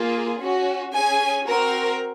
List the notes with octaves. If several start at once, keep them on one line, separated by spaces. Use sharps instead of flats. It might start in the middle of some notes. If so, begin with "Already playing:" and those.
Already playing: A#3 F4 G#4
C#4 F#4
C#4 G#4 G#5
C4 F#4 A#4